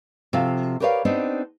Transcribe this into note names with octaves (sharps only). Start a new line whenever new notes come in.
C3 F3 F4 F#4 A4 F5
G4 A#4 B4 C#5 D5 F5
B3 C4 D4 D#4 G4